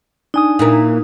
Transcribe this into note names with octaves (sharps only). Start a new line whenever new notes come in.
D4 D#4 G#5 D#6
A#2 E3 A#3